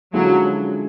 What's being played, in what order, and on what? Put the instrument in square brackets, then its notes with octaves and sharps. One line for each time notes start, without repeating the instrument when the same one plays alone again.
[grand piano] D3 F3 G#3 C#4 E4 [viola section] F#3